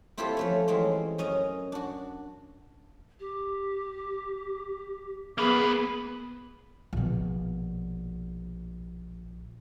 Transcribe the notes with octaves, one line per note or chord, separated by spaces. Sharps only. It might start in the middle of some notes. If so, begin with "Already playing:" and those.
C4 E4 F4 G4 A4 C5
F3 A3 C#4
E3 G#3 C4 C#4
F#2 C#4 D#5 A#5
D4 F#4
G4
A#3 B3 G#4 B4
A#1 B2